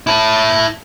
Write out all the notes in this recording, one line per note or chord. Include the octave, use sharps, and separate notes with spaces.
E4 A5